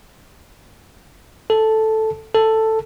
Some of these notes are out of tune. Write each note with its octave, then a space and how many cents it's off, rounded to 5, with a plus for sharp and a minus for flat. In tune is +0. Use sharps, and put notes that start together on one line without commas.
A4 -5
A4 +5